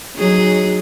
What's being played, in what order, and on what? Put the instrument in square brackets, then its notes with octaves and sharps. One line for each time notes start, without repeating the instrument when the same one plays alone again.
[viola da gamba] F#3 D#4 G#4